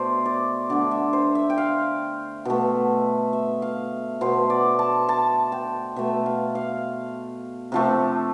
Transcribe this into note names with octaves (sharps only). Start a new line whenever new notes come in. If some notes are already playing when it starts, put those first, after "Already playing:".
Already playing: B2 A3 C5 D5
D5
D3 A3 D5
E5
C5
E5
G5
F5
B2 A3
E5
F5
B2 A3 C5
D5
A5
A5
G5
B2 A3 E5
F5
F5
C3 F3 A3